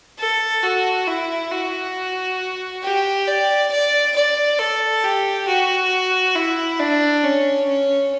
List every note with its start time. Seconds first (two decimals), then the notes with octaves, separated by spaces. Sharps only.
0.19 A4
0.63 F#4
1.07 E4
1.51 F#4
2.83 G4
3.27 D5
3.71 D5
4.15 D5
4.59 A4
5.03 G4
5.47 F#4
6.35 E4
6.79 D4
7.24 C#4
7.68 C#4